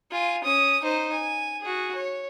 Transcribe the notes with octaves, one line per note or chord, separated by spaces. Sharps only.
F4 G#5
C#4 D#6
D#4 C5
G#5
F#4 G#4
C#5